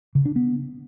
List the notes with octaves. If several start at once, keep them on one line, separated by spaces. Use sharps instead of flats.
C#3
D4
B3